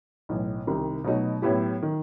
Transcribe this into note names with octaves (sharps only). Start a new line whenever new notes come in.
B1 A2 E3
C2 C3 D#3 G3
B2 F#3 A3 D#4 F#4
A2 F#3 B3 E4 G4
D#3